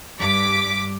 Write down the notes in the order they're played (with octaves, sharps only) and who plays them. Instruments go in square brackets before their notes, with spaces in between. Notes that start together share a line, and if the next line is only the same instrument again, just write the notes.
[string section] G2 D6 B6